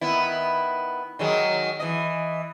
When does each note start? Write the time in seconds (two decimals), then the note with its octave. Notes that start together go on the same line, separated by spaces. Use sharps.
0.01 D#3 B3 E4
1.19 D#3 F#3 G#3
1.80 E3 D#5